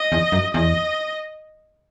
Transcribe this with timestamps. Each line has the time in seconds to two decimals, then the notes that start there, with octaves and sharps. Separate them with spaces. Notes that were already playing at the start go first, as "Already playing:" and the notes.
Already playing: D#5
0.12 E2
0.32 F#2
0.54 E2 D#5